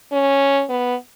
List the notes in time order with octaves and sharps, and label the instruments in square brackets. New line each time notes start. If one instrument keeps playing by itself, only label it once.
[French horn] C#4
B3